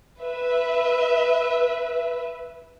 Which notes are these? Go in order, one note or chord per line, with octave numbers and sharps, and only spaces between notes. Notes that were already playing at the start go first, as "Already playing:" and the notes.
B4 E5